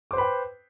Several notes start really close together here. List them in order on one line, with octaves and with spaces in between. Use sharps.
D6 C5 B4 B5 G5